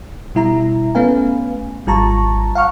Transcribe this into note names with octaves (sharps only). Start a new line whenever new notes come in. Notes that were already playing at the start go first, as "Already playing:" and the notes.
B2 G3 E4 E5 A#5
A3 B3 C#4 B4 F5 G#5
G#1 G3 F4 A5 A#5 C#6
F5 F#5 A#5 C#6 F6